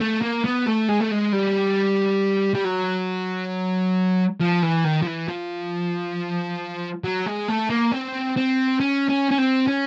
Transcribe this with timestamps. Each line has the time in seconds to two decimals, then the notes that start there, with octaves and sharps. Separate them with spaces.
0.01 A3
0.22 A#3
0.45 B3
0.67 A3
0.89 G#3
1.00 A3
1.11 G#3
1.32 G3
2.55 G3
2.65 F#3
4.40 F3
4.62 E3
4.84 D#3
5.02 F3
5.06 E3
5.28 F3
7.04 F#3
7.26 G#3
7.48 A3
7.70 A#3
7.92 C4
8.36 C4
8.80 C#4
9.09 C#4
9.31 C#4
9.38 C4
9.68 C#4